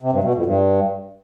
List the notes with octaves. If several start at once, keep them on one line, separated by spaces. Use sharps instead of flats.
C3
G2
B2
F2
G2